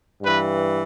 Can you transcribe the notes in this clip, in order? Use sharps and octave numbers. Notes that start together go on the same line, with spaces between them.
G2 E3 B4